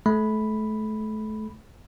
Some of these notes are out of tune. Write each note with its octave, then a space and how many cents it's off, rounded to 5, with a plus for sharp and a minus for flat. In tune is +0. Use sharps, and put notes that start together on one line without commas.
A3 -30 B5 +0